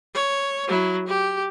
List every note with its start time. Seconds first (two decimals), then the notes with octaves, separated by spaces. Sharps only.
0.14 C#5
0.68 F#3 E4
1.07 G4